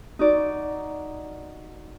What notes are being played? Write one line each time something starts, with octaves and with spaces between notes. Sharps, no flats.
D#4 F#4 D5